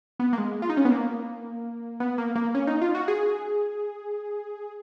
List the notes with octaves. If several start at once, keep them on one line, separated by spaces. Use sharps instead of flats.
B3
A#3
G#3
F4
D#4
C#4
B3
A#3
B3
A#3
A#3
C#4
D#4
F4
F#4
G#4